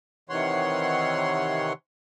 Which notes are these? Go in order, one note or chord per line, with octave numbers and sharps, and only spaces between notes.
C3 D#3 E3 C#5 F#5 C6